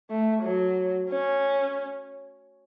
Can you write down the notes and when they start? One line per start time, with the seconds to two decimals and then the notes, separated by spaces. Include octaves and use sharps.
0.10 A3
0.43 F#3
1.10 C#4